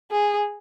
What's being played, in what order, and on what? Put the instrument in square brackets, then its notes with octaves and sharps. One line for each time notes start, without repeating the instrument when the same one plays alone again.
[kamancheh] G#4